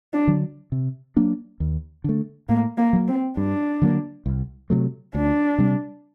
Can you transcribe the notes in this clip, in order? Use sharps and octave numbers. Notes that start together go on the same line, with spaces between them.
D4
D3 F#3
C3
F#3 A#3 D4
D#2
D3 A3
A2 A#3
A#3
F#3 A#3
C4
G2 D4
D3 F#3 A#3
C2
C3 F#3 A3
D2 D4
C3 G3